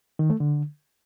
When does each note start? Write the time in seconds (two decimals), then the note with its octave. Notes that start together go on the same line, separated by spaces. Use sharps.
0.19 D#3
0.30 A3
0.40 D3